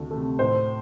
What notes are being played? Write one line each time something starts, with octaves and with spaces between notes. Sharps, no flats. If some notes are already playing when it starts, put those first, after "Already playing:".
Already playing: D2 C3 A3
C3 A3
A2 C5